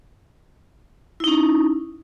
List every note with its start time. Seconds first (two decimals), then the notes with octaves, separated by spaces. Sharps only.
1.20 E4
1.24 D#4
1.28 C#4